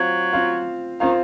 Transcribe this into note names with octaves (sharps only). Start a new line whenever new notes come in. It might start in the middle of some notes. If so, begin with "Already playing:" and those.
Already playing: F#3 C4 F4 C5 F5
C4 F4 C5 F5
D#3 C4 F4 C5 F5